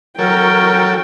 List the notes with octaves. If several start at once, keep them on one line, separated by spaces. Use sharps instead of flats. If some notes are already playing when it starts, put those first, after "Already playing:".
F#3 A4 A#4 C#5 G5